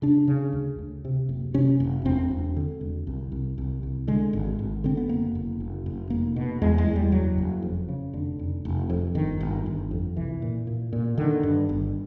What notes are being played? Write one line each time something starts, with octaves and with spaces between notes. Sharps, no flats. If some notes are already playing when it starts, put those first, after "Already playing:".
C#3 D4
C#3
D2
D2
C3
F#1
C3 C#4
F#1
E1 C4
E1
D3
E1
C2
C2
C2
C2
D3 G#3
G#1
G#1
D3 C4
B3
F#1 A#3
F#1
F#1
F#1
F1 A#3
B2
E2 G#3
G#3
E2
G3
F#1 F#3
F#1
F2
C#3
F1 D3
F1
F1
F2
G1 D#3
G1
G1
F2
C2 E3
A#2
A#2
A#2
D3 D#3
G2
G1